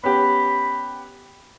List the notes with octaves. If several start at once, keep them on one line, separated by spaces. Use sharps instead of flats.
B3 C#4 G4 B5